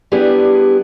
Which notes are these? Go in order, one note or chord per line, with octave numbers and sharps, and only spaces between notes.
G3 B3 D4 E4 G4 G#4